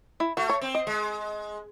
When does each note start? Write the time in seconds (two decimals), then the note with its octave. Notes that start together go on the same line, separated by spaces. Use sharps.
0.20 E4
0.37 A3 F#4
0.49 C#5
0.61 C4
0.75 D#5
0.87 G#3